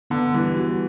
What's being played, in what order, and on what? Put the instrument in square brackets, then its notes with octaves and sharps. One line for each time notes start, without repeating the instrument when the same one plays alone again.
[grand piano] D3 [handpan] B3
[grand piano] E3 [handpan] G3
[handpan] F#4